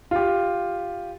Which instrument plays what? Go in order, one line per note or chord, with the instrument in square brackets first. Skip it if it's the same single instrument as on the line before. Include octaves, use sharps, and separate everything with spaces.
[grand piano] F4 G4